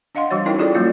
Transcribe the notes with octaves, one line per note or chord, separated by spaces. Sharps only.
D4 D#5 F5 F#5 C6
E3 G3 F#4 C#5
C#4 D#4 E4 A#4 G5
F4 F#4 G#4 A4 C#5 D5
F#3 G3 A#3 C#4 F4